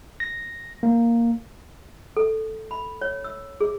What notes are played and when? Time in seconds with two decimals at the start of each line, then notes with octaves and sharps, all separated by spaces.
0.20 A#6
0.83 A#3
2.17 A4
2.71 B5
3.01 C#5
3.24 E6
3.61 G#4